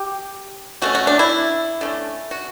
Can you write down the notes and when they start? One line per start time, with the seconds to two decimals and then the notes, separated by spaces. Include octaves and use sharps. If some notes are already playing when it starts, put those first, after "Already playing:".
Already playing: G4
0.82 B2 A3 C#4 F#4
0.95 F#4
1.07 D4
1.19 E4
1.81 D3 A3 C#4
2.31 F#4